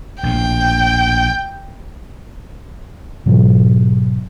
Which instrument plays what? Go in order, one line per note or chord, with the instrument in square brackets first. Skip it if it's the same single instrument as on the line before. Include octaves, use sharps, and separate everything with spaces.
[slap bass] A#1 A2 [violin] G5
[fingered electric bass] G#2 B2 F#3